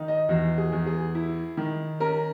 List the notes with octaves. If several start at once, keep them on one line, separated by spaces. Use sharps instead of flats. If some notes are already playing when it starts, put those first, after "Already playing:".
Already playing: D#3 D#4
D#5
E2 F#4
G#4
E2
G#4
E4
D#3
C#4 A#4